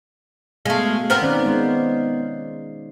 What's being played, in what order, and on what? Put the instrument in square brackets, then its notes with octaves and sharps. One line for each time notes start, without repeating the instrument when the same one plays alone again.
[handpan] B2 F5 [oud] G#3 A3
[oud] B3 C4 A#4
[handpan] D#3 C#4 D5
G#3 C5